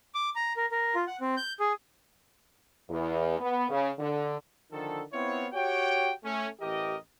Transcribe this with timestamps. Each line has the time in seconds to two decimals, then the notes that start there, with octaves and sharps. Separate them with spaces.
0.15 D6
0.36 A#5
0.57 A#4
0.72 A#4
0.95 F4
1.07 F#5
1.21 C4
1.37 G6
1.60 G#4
2.90 E2
3.39 B3
3.70 C#3
3.98 D3
4.72 D3 D#3 F3 A4
5.13 B3 C4 E4 F4 C#5
5.53 F#4 G4 C#5 G5
6.24 A3 C#4
6.61 A1 E3 G4 A#4 D#5